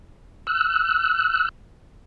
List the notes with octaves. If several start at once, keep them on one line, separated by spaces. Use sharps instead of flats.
E6 F#6